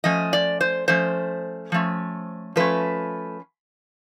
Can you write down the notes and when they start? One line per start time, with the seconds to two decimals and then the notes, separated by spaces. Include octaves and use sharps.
0.04 F3 A3 C#4 D#5
0.33 D5
0.61 C5
0.88 F3 A3 C#4 C5
1.72 F3 A3 C#4
2.56 F3 A3 C#4 B4